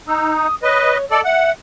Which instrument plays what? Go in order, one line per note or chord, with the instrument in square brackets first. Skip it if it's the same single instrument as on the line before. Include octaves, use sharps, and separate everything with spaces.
[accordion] D#4 [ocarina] E6
[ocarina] D#6
[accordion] B4 D#5 [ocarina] C#5
[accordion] A4 D5 [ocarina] D#5
[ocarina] E5 [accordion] F#5